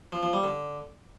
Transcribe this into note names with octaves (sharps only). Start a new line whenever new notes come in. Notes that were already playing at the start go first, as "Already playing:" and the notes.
F3
F3
G3
D3